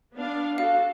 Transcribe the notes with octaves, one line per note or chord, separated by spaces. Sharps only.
B3 D4 F5
F#4 A4 F5